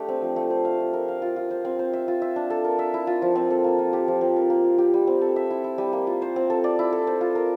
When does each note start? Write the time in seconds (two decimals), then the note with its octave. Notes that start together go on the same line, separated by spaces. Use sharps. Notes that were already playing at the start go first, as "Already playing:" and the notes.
Already playing: A3 D4 G4
0.09 C4
0.22 F3
0.36 A3
0.50 C5
0.65 F5
0.79 F4
0.93 A#4
1.08 F5
1.22 F4
1.36 F4
1.51 C5
1.65 C4
1.79 C5
1.93 E5
2.08 F4
2.22 E5
2.36 D4
2.50 A4
2.64 A#4
2.79 E5
2.94 E4
3.07 F4
3.22 F3
3.36 C4
3.50 A4
3.64 A#3
3.79 F4
3.93 G4
4.08 F3
4.21 C4
4.36 A#4
4.50 A#3
4.64 F4
4.78 G4
4.94 G3
5.07 C4
5.21 A4
5.36 E5
5.51 E4
5.64 E4
5.78 G3
5.93 A#3
6.07 F4
6.22 C5
6.36 C4
6.50 A4
6.64 D5
6.79 E4
6.92 A4
7.07 C5
7.21 F4
7.35 A#4